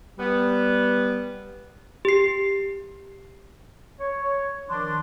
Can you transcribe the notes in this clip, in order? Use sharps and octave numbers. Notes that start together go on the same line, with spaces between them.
G3 B3
G4 C7
C#5
D#3 F3 D4 C6